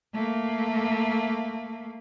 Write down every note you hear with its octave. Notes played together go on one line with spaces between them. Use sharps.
A3 A#3